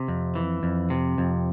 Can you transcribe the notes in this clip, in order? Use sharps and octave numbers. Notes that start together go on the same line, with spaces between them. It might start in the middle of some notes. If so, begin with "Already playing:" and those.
Already playing: C3
F2
E3
F2
C3
F2